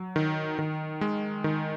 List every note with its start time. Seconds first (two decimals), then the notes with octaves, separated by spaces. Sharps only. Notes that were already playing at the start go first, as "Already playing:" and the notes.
Already playing: F#3
0.16 D#3
0.59 D#3
1.01 G#3
1.44 D#3